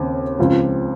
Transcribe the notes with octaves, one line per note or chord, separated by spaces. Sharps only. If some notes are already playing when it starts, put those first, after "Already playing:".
Already playing: D#2 C#3 C4
C#2 C#3 F3 C4